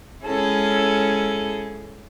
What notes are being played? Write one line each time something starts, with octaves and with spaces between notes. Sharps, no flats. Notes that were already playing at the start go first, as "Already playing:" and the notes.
G#3 C#4 E4 G#4 A4